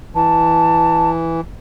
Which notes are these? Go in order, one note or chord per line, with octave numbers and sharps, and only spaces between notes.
E3 A5